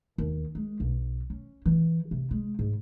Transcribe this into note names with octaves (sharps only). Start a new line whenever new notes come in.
D#2
G#3
B1
C#4
E3
C3
G#3
G#2